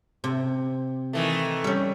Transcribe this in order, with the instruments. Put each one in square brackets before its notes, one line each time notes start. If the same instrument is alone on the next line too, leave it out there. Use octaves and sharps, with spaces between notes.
[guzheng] C3
[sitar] D#3 E3 A3
[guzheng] G3 C#4